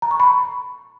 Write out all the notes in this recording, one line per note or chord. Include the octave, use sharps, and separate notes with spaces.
A#5
C#6
B5